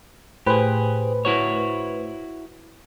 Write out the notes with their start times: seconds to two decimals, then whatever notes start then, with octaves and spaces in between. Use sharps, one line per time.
0.47 A2 G4 G#4 B4 C5
1.25 E4 F#4 C#5